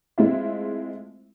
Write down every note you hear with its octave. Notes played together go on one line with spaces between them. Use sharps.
G#3 A3 C4 E4 F4 E5